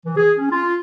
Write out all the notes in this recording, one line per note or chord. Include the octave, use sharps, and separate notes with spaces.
E3
G#4
C#4
F4